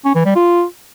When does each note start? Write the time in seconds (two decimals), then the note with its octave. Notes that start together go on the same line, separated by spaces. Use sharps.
0.05 C#4
0.15 E3
0.26 G3
0.36 F4